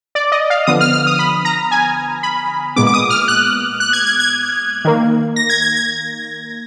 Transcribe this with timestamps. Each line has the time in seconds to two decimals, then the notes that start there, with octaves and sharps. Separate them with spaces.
0.15 D5
0.32 D#5
0.50 F5
0.67 D3 F3 B3 D#6
0.81 F6
0.93 F6
1.06 D#6
1.19 B5
1.45 A#5
1.71 G#5
2.23 B5
2.76 A#2 G#3 B3 D6
2.87 D6
2.94 D#6
3.10 F6
3.28 F#6
3.80 F#6
3.93 G#6
4.07 G#6
4.20 G#6
4.85 D#3 A#3
5.36 A#6
5.50 G#6
5.62 G#6
5.76 G#6